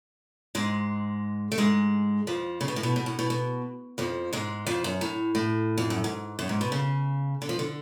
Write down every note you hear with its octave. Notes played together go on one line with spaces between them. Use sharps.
G#2 G#3
A3
G#2 G#3
F2 F3
C#3
B2
A2
B2
B2
A2
B2
B2
F2 F3
G#2 G#3
F2 F3
F#2
A2
A2
F2
F#2
G#2
F#2
G#2
B2
C#3
D3
F3
D3